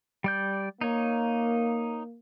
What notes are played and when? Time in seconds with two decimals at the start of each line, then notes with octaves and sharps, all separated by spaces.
0.24 G3 D5 G6
0.81 A#3 D#4 C#5